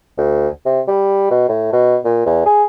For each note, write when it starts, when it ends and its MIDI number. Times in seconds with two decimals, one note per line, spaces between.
0.18 0.48 38
0.65 0.81 48
0.88 1.28 55
1.31 1.46 47
1.49 1.71 45
1.73 1.97 47
2.05 2.22 46
2.26 2.44 40
2.46 2.64 68